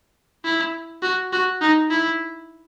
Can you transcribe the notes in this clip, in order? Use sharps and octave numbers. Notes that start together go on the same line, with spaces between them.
E4
F#4
F#4
D#4
E4